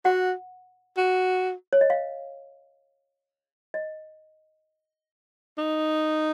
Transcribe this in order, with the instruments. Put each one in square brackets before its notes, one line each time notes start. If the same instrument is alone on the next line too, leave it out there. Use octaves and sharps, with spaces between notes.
[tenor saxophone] F#4 [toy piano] F#5
[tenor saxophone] F#4
[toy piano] C#5
D#5
F5
D#5
[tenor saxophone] D#4